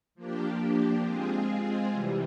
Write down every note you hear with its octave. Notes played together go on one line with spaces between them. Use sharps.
F3 A#3 D4 G4
G#3 C4 F4 G#4
C3 E3 G3